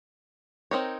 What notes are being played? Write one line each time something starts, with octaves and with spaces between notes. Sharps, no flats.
C4 D#4 A#4 C#5